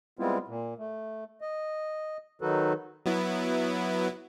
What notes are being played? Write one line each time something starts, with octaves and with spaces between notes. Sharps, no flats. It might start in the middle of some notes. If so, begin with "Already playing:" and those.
G3 G#3 B3 C4 E4 F4
A#2
A3
D#5
D#3 F#3 D#4 F#4 A4 B4
F#3 B3 E4